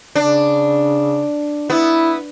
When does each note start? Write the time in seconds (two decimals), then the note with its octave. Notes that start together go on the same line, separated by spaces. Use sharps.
0.15 C#3 D4
1.70 B3 E4